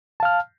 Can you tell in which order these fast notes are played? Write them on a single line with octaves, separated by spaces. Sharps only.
A5 F5 F6